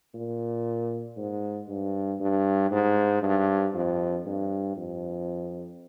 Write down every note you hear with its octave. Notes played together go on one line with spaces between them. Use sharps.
A#2
G#2
G2
G2
G#2
G2
F2
G2
F2